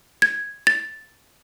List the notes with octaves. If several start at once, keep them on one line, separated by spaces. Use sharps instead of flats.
G#6
A6